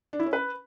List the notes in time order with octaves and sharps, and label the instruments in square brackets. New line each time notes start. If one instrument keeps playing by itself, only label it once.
[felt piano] D4
E4
C#4
B4